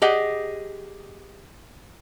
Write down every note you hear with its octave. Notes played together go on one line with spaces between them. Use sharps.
G4 G#4 D#5 F#5